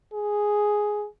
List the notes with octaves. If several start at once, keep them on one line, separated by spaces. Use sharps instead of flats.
G#4